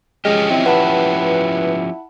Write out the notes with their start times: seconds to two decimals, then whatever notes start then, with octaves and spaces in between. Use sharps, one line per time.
0.25 F3 G#3 C#4 G4 D#5 F6
0.50 C4 E4
0.66 B4 F#5 A5 B5